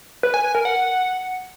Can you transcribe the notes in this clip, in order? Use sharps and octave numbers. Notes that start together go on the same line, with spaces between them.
B4
G#5
G#5
A#4
F#5